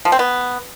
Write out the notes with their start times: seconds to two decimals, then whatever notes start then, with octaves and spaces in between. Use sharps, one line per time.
0.05 F3
0.12 C4
0.19 B3